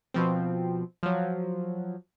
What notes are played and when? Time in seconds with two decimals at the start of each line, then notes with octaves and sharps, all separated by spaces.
0.14 B2 F3 C4
1.03 F3 F#3